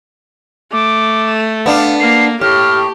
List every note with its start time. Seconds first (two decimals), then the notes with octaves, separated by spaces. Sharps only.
0.73 A3 D6
1.66 B3 D4 F5
2.00 A#3 C7
2.41 A2 G4 F6